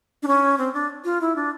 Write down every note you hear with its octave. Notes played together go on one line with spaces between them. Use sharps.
D4
C#4
C4
D4
F4
E4
D4